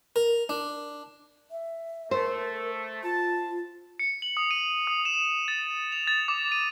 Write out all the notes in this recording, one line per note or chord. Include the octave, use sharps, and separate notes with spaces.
A#4
D4
E5
A3 A#4 C5
F4 A5
C#7
F#7
D#6
D#7
D#6
E7
A6
F7
A6
D6
D#7